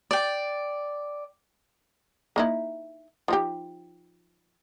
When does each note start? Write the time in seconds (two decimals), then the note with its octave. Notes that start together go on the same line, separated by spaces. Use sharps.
0.11 D5 G5
2.36 A#3 D#4 E4
3.28 F3 D#4 G4